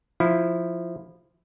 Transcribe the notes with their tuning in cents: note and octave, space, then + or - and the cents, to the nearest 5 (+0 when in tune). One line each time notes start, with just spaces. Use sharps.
F3 +0 E4 +0